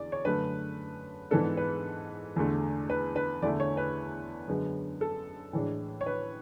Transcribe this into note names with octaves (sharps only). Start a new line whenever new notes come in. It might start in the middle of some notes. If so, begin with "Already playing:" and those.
Already playing: E2 D5
C#5
F#2 D3 A3 B4
G#2 E3 B3 D4 A4
B4
E2 D3 A3
B4
B4
E2 D3 A3 E4 D5
C#5
B4
F#2 D3 G#3 B3
A4
A2 E3 G#3 D4
C#5
B4